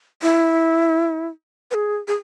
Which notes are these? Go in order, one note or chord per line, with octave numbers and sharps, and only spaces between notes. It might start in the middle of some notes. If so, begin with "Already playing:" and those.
E4
B4
G#4
G#4